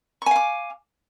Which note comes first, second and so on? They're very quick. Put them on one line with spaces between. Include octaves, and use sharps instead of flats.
C#6 G#5 F5 D6